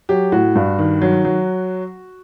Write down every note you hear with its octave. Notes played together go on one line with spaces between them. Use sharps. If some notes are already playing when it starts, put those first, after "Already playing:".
F#3 G4
A2 F#4
G2
D#3
F#3
F#3